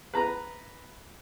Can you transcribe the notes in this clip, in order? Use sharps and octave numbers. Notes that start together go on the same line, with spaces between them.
B4 A#5